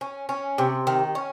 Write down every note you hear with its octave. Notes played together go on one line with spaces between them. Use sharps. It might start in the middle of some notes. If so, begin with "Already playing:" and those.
C#4
C#4
C3
D#3
C#4